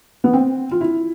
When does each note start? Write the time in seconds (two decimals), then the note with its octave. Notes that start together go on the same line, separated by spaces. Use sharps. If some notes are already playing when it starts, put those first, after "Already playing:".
0.24 B3
0.33 C4
0.71 F4
0.81 E4